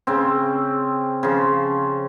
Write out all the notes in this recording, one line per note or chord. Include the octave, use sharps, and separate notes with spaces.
C#3 C4
C#3 F3